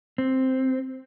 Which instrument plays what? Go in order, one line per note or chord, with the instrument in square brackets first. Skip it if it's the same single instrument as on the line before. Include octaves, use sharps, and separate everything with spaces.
[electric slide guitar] C4